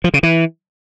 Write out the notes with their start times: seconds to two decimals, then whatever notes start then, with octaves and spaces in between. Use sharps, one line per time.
0.04 F3
0.14 C#3
0.23 E3